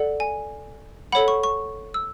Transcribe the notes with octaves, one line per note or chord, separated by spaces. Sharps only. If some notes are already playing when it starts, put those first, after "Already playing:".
Already playing: A4 D5 F#5
G#5
A4 C#5 F#5 B5
C#6
C#6
E6